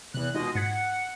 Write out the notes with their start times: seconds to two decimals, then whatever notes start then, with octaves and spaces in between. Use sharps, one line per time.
0.14 E2 C3 E3 F#6
0.34 B2 G#3 D#4 F4 D#5
0.55 G#2 F#5 G#6 B6